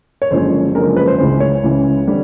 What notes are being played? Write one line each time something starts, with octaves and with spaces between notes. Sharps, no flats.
C#5
F#1 F#2 D3 F3 G#3 C5
F#1 F#2 D3 F3 G#3 A#4
B4
C5
C#2 C#3 E3 C5
C#5
C#2 C#3 E3
D3 G3 C4